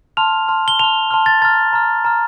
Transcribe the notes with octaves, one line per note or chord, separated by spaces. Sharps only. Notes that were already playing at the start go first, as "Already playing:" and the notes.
A5 C6 F6 F7
A5 C6 F6
G7
A5 C6 F6 F7
A5 C6 F6
A6
A#5 F6 A6
A#5 F6
A#5 F6